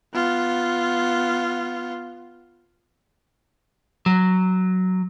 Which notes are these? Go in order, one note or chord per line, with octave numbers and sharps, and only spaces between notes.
B3 F4
F#3